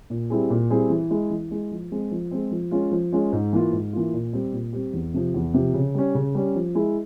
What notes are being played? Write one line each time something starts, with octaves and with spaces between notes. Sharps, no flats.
A#2
G3 C4 E4 G#4
A#2
G3 C4 E4 G#4
E3
G#3 E4
E3
G#3 E4
F3
G#3 C4
F3
G#3 C4
F3
G#3 C#4 F4
F3
G#3 C#4 F4
G#2
E3 A#3 F4
G#2
E3 A#3 F4
A#2
G3 C4 G4
A#2
G3 C4 G4
E2
C3 F3
E2
C3 F3
C#3
G3 C#4
C#3
G3 C#4
F3
G#3 E4 G#4